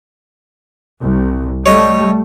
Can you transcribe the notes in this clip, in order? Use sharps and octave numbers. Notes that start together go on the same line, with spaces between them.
C2
G3 A3 C#5 D#5